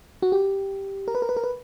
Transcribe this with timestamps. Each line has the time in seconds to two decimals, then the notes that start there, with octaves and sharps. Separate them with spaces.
0.22 F#4
0.32 G4
1.08 A#4
1.15 B4
1.22 A#4
1.29 B4
1.37 A#4
1.44 B4